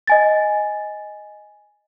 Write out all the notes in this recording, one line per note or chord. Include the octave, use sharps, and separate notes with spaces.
D#5 G#5 A6